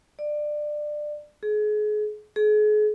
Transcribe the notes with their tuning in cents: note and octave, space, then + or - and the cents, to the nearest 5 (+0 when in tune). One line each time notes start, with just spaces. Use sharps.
D5 +20
G#4 +30
G#4 +35